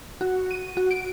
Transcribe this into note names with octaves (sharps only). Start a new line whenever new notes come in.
F#4
D#7
F#4
D7